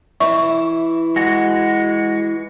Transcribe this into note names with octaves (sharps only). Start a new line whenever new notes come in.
E3 E4 E5 C#6
G#3 F#4